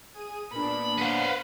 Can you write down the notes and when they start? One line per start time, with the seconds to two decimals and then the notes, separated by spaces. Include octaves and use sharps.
0.14 G#4 D#7
0.52 A#2 B3 D4 B5
0.98 B4 C5 F5 F#5